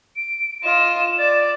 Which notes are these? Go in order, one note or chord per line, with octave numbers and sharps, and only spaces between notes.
D7
F4 D#5 E7
D5 A6